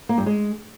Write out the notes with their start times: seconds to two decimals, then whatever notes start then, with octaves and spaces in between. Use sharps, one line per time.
0.09 A#3
0.18 G2
0.26 G#3